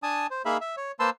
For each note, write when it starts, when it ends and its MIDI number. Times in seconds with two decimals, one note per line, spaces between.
0.03 0.27 62
0.03 0.27 80
0.03 0.27 81
0.03 0.27 87
0.31 0.42 72
0.45 0.57 58
0.45 0.57 63
0.45 0.57 68
0.45 0.57 76
0.45 0.57 77
0.45 0.57 83
0.61 0.76 76
0.77 0.92 73
1.00 1.10 58
1.00 1.10 71
1.00 1.10 72
1.00 1.10 81
1.00 1.10 84
1.00 1.10 88